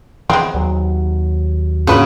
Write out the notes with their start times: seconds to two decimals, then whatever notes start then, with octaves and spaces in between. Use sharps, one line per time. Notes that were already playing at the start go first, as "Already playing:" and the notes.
0.30 E3 G#3 B3 C4
0.54 D#2 F#3
1.87 F2 G#2 C#3 A#3 D4 F#4 B4